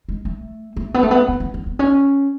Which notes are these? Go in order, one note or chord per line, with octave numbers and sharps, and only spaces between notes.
G#3
A3
A3
B3
A3
B3
B3
B3
B3
B3
C#4